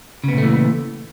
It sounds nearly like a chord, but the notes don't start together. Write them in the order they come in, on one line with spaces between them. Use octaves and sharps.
C#3 B3 A#2 A3 E3